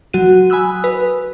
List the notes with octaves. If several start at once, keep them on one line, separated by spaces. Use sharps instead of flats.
F#3 F#4 D#7
G#5 B5 D#6 E6 F#6
B4